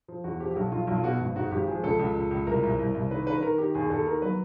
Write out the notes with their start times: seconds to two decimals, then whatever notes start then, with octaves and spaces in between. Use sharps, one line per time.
0.08 F3
0.24 E2 F#4
0.40 F3 G4
0.50 G4
0.55 B1 F#4
0.72 B1 F4
0.87 B1
0.94 F4
1.04 B2 F#4
1.20 G#1
1.35 G#2 F#4
1.51 G#1 G4
1.68 F3 G#4
1.84 C#2 A4
1.99 C#2
2.15 C#2
2.31 C#2
2.47 C2 A#4
2.63 C2
2.79 C2
2.95 C2
3.11 D#3 B4
3.26 D#3 B4
3.37 B4
3.43 D#3 A#4
3.58 D#3 G4
3.74 D#2 G#4
3.90 D#2 A4
4.06 D#3 A#4
4.22 F#3 B4